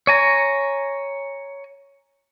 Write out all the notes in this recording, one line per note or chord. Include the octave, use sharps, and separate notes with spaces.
C#5 G#5 A#5